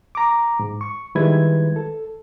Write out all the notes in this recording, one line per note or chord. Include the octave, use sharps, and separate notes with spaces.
A#5 D6
G#2
C#6
D#3 G3 G#3 E4 B4 G#6
A4